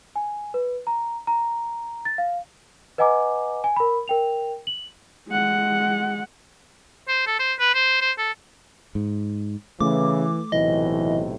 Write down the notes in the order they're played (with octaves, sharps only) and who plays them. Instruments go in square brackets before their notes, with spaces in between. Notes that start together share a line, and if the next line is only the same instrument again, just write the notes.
[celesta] G#5
B4
A#5
A#5
A6
F5
B4 D#5 F#5 G#5 A#5 D6
G#5
A#4 B5
A#4 G5 F7
F#7
[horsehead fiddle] G#3 F#5
[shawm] C5
A4
C5
B4
C5
C5
A4
[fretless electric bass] G#2
[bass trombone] C#3 [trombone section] E3 [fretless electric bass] A3 [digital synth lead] D6
[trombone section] B1 A2 C3 [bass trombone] E3 [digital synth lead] D#5